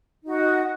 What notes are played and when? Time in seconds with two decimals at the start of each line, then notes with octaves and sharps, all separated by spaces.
0.23 D#4
0.26 F#4
0.30 D#5